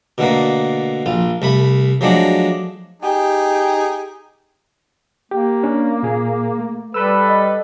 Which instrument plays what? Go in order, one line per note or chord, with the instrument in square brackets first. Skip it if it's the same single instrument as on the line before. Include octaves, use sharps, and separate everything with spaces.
[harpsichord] B2 D3 A3 A#3
A#1 F4
C2 A3 B5
F3 F#3 G#3 A3 D4
[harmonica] D#4 G#4 [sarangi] G4
[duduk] A#3 [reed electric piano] G4
[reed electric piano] C#4 D4
A#2 G#4
A3
[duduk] G3 [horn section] A4 B4 [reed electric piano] E6
[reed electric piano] D#5